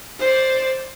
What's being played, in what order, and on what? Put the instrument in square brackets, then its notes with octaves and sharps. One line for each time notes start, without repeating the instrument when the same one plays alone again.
[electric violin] C5 D5